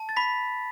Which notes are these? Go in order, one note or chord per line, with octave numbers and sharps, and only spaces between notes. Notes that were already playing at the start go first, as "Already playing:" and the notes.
Already playing: A5
A6
B5 B6